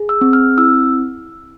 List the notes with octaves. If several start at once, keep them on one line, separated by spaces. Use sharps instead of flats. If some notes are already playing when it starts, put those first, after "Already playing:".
Already playing: G#4
E6
C4
F6
E4 E6